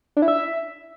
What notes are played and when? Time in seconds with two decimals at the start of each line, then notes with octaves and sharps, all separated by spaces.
0.17 D4
0.22 E4
0.28 E5